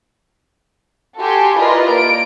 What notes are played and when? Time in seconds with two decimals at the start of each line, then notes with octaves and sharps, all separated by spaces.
1.18 F#4 G4 A4 G5 G#5 C6
1.57 E4 F4 A#4 B4 D5 D#5
1.89 A#3 D7